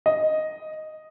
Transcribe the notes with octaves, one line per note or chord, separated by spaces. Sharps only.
D#5